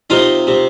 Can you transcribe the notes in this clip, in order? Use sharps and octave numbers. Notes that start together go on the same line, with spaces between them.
C3 D#4 F4
C3